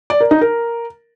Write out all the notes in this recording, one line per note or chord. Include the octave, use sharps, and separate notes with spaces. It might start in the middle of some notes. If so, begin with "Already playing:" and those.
D5
A#4
D#4
A#4